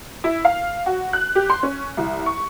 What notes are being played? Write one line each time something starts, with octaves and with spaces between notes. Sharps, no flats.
E4
F5
F#4
F#6
G4
C6
C#4
C2
C#6